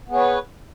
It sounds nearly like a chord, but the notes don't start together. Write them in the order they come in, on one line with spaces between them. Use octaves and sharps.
B3 G#4 C#5 B4